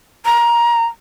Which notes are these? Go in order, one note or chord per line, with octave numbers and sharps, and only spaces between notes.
A#5